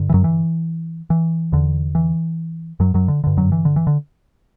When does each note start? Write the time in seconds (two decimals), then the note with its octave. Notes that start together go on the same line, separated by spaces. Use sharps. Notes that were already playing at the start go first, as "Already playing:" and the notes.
Already playing: G2 D3
0.09 E3
0.14 F#2 F#3
0.24 E3
1.10 E3
1.52 E2 D3
1.95 E3
2.80 F#2 F#3
2.94 F#2 F#3
3.08 D3
3.24 G2 D3
3.37 F#2 F#3
3.52 E3
3.65 D3
3.76 E3
3.87 D3